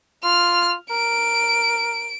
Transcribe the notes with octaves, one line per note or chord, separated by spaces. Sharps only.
F4 F6
A#4 D7